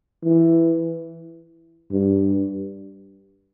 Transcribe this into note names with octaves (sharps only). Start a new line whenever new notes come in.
E3
G2